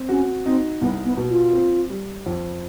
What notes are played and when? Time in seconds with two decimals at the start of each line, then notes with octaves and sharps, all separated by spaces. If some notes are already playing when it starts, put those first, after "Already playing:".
Already playing: C4
0.09 C#4 F#4
0.45 C4 D#4
0.81 C2 B3
1.05 B3
1.17 B2
1.30 F4
1.53 C4
1.90 G3
2.26 F2